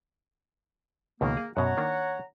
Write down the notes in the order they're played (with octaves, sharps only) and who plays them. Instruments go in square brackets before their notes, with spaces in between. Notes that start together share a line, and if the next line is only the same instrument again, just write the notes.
[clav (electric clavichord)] C#2 B2 D#3 [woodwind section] A#3
[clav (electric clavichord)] G#4
[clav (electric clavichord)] F#2 B2 [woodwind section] C#5 F#5 A#5
[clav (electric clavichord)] D#3 A#3 D4